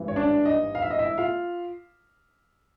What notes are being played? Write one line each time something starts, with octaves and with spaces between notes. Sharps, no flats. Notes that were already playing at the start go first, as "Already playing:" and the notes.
Already playing: G#1 G2 E3
C#5
D4 D5
D#4 D#5
F5
E5
D#5
E4 E5
F4 F5